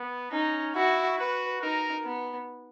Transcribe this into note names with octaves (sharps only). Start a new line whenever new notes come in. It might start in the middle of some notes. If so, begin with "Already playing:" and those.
Already playing: B3
C#4 D#4
E4 F#4
F#4 B4
D#4 A#4
B3